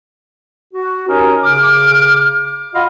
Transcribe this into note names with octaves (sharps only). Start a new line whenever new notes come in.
F#4
C#4 D#4 G4 A#4 C#5 G#5
C#3 D6 F6
F4 F#4 D#5 F5 F#5 B5